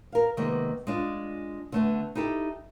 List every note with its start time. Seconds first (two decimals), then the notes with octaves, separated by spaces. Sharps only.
0.12 A#4 F5
0.37 C3 D#3 G#3 A#3 B3
0.87 G#3 D4 F4
1.72 D3 A3 B3
2.15 D#4 E4 G4 A4